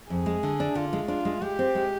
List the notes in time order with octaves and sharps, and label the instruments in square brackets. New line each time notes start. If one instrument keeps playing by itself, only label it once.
[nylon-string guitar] F2 [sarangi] G#4
[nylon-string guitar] G#3
D3
D4
[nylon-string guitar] D3 [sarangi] F4
[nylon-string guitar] G#3
[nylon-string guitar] D4 [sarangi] F4
[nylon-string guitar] G#3
[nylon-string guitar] G#3 [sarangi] G4
[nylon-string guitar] C4
G#3